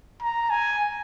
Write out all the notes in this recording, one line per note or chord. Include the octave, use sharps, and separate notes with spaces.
A#5
G#5